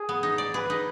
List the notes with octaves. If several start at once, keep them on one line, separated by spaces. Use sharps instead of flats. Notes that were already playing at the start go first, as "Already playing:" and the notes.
Already playing: G#4
B3
D#4
D5
G#4 B4
D#4